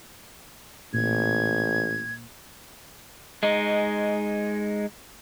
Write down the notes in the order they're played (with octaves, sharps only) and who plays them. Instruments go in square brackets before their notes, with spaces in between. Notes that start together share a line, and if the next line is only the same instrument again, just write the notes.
[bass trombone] A1 [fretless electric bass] A#2 [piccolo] G#6
[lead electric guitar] G#3 D#4